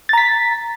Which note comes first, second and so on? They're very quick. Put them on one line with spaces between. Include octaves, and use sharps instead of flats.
A6 A#5 B6